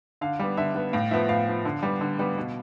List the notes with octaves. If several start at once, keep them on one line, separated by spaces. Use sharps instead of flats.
D3 F5
G3 B3
D3 E5
G3 B3
A2 F5
F3 B3 E5
A2 F5
F3 B3
D3
G3 B3
D3
G3 B3
B2